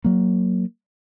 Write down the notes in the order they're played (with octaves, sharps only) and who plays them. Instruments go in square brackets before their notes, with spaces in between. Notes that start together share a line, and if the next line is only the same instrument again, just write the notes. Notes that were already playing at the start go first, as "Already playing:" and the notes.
[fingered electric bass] F#3 A#3